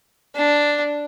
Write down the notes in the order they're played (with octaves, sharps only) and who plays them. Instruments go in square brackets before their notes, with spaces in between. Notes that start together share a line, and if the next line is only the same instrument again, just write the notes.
[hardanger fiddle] D4